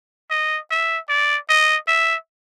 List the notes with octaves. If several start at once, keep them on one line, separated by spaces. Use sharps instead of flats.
D#5
E5
D5
D#5
E5